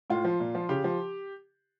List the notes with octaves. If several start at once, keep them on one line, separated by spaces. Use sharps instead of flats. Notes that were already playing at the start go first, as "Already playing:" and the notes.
A2 F4
F3
A#2
F3
C#3 G4
F3